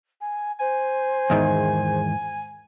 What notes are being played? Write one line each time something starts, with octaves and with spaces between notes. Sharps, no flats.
G#5
C5 G#5
E2 G#2 D#3